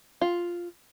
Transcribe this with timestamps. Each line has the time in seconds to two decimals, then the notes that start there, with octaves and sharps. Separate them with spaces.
0.21 F4